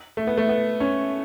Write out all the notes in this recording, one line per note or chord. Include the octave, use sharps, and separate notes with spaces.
A3
B3
A3
B3
C#4